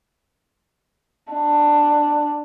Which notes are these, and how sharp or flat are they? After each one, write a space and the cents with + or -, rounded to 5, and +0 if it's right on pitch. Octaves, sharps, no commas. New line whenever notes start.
D4 +10